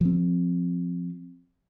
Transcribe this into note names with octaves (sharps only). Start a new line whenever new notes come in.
F3 C4